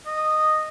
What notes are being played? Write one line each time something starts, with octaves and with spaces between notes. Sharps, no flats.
D#5